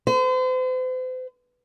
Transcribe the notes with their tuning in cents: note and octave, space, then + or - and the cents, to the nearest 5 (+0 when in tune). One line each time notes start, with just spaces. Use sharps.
C5 -40